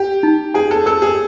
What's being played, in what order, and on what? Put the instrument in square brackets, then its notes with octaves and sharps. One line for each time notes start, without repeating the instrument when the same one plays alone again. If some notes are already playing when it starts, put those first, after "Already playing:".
Already playing: [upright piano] G4
[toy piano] D#4
[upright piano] G#4 [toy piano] G#5
[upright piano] A4
[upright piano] A4 [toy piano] A#4
[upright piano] G#4